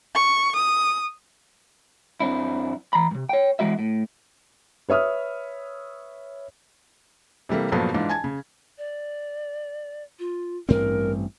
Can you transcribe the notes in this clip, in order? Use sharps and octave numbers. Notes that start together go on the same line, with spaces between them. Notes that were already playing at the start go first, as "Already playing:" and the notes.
C#6
D#6
F#2 C4 D4 E4
E3 A#5 B5
G2 C3
C#5 G5
B1 E3 G#3 F#4 E5
A2
B4 C#5 E5 D#6 F6
C3 E3 G3 A3 A#3
G2 A#2 F3 F#3 A3 B3
G#2 E3 D4 F4
G#5 A5 G#6
C#3
D5
F4
A1 G2 C4 A#4